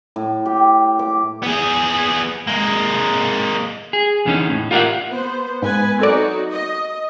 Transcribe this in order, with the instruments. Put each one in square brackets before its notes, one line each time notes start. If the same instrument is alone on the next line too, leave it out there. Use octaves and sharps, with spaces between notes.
[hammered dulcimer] A2
G4
D6
[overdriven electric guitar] B3 G#4
G#3 A#3
[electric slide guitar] G#4
E2 D3 E3 A#3 C#4 D#4
A2
F4 G4 A#4 D5 E5 F#5
[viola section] B3 C5
[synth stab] G#2 [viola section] B3 B4 G#5
[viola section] F#3 D#4 F#4 [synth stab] C4 A4 D5
[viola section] D#5